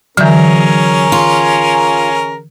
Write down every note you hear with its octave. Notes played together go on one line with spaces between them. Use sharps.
D3 E3 F#3 C#4 G#4 A#4
F4